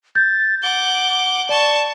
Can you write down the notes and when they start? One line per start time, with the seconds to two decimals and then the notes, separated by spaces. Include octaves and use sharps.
0.15 G6 A6
0.63 F#5 D6 G7
1.49 D5 A5 C#6